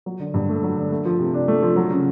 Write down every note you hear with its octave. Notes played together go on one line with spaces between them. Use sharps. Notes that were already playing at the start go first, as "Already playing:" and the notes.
F#3
D3
G2
A3
F#3
D3
A3
F3
C3
D4
A3
F3
F#3
C#3